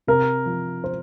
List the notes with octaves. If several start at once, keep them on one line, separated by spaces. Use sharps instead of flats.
C3 A#4
F3
C5